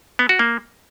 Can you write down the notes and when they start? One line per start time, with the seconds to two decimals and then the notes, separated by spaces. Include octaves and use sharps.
0.19 B3
0.29 F#4
0.39 A#3